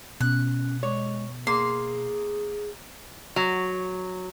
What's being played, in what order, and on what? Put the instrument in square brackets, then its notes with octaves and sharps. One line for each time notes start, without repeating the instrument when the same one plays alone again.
[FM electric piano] B2 [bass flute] C#4 [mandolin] F#6
[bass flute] G#3 [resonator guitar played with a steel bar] C#5
[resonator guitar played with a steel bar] A#3 [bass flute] G#4 [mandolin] C6
[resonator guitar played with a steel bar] F#3